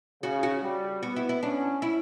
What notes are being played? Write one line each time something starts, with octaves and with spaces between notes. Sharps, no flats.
C#3 F#4
F#4
G3
B3 F#4
E4
E4
C#4 D4
E4